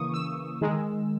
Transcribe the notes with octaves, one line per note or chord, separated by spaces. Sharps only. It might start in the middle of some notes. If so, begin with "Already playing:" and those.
Already playing: C#3 E3 A#3 C#6 D#6
E6
D#3 G#3